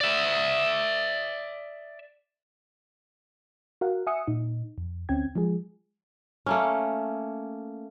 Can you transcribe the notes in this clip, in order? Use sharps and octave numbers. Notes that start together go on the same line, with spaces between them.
D5 E5
F#4 A#4 F5 F#5
E5 F#5 G#5 D#6 E6 C#7
A#2 D#4
F2
D2 C4 C#4 G5 G#6
F3 G#3 G#4
A3 A#3 C#4